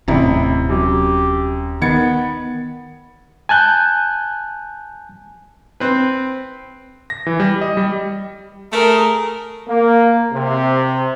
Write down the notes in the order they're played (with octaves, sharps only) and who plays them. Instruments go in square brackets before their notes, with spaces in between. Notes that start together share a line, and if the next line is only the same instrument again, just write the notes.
[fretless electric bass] D#1 C3 [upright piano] A1 E4 A#5
[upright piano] F#2 [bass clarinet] G4
[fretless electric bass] D#3 [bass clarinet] B3 [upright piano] G#6 A6 C#7
[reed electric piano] G#5 A5 F#6 G6
[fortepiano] C4 B4
[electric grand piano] A#6
E3
G3
D#5
G3
[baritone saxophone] A3 [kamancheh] G#4 A#4
[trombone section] A#3
C3